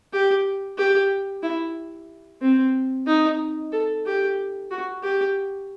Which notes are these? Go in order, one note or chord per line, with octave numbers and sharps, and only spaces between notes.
G4
G4
E4
C4
D#4
A4
G4
F#4
G4